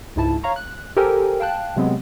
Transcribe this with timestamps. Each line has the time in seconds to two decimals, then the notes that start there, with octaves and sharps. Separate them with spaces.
0.16 C#2 G#2 E4 A5
0.43 C#5 F5 A#5 C#6
0.56 F#6
0.97 G4 A4 A#4 C5 G5 G#5
1.40 F5 G5 A5 F#6
1.76 C3 F#3 G#3 B3 C4